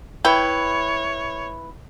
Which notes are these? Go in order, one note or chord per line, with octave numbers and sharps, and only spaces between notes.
E4 B4 C#5 G5